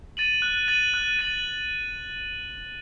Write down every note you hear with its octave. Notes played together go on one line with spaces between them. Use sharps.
A6 D#7 F#7
F#6
A6 D#7 F#7
F#6
A6 D#7 F#7